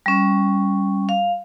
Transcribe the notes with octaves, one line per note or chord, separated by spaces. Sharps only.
G3 C#4
F5